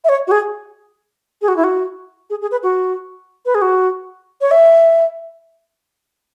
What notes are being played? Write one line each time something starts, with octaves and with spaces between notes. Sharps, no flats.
E5
C#5
F#4
G#4
G#4
F#4
E4
F#4
G#4
G#4
B4
F#4
B4
G#4
F#4
C#5
E5